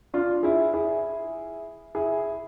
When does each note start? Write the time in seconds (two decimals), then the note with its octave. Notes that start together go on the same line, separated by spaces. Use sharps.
0.14 D4 F4
0.43 E4 G#4
0.74 E4 G#4
1.95 E4 G#4